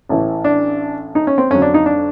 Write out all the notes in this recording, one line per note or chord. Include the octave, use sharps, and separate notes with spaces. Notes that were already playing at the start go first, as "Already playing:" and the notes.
A1 A2 E3
D4
D#4
C#4
C4
F2 D3 F#3 C#4
D4
D#4
D4